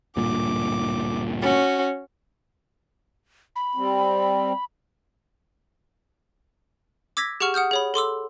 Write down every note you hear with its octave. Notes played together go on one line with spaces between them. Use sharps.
D1 G2 A#2 D6
C#4 F#4
B5
G3 C4
D6 E6 G#6 A#6 B6
G4 G#4 F#5 C#6 F6 E7
F#5 D#6 F6 G6
G#4 C#5 B5
A4 C6 D6 E6